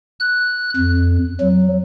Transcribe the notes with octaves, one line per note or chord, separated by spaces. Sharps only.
F#6
F2
F#3